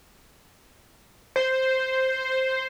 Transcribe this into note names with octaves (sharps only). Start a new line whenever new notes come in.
C5